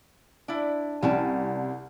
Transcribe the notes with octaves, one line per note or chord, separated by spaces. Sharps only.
D4 E4
C2 G3 C#4 A5